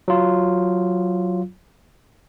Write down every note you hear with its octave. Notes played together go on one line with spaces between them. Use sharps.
F#3 F4